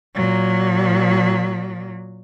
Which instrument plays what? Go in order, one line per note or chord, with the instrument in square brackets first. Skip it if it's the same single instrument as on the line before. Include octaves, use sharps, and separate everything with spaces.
[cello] A#2 F#3